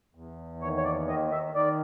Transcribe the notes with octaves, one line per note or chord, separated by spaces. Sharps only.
E2
D#2 C#5
C#5
D5
D#3 D#5
E5
D#3 D5